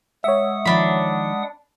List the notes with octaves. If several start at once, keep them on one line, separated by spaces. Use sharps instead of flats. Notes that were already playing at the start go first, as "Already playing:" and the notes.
G#3 C#5 E5 F#5 D#6
D#3 F3 D4 B5